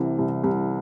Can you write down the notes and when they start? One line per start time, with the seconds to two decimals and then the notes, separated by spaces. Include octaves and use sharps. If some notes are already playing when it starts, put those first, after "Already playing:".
Already playing: C2 C3 E3
0.18 C2
0.43 C2